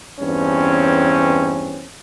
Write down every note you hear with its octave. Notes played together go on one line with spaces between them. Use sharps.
E2 G2 C4 C#4